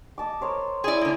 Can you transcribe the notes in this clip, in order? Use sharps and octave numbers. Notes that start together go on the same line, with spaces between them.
D#5 A5 D6
A#4 C5 C#5
E4 G#4 D5 G#5
D3 A#3